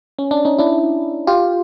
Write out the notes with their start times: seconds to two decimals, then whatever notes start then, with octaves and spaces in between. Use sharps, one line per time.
0.19 C#4
0.31 D4
0.45 C#4 D#4
0.58 D4 E4
1.27 F4 G4